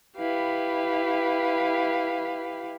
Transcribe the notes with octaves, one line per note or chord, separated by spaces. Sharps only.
E4 G4 B4 F5